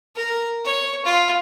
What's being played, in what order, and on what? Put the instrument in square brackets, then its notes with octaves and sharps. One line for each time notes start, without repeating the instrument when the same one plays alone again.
[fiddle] A#4
C#5
F4